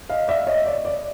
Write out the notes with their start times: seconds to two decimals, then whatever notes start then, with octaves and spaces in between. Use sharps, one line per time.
0.10 D#5 F5
0.28 D5 E5
0.47 C#5 D#5
0.66 D5
0.85 D5